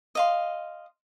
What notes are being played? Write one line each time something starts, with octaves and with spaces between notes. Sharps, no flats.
D#5 F5 C6